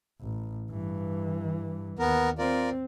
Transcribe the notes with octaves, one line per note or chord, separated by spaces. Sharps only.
A1
G2 E3
D#2 B3 A#4
C4 F4 A#4 D5